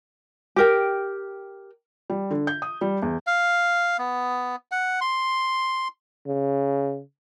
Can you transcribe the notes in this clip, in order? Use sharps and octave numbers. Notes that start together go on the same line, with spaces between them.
G4 A#4 G5
G3
D3
G6
D#6
G3
E2
F5
B3
F#5
C6
C#3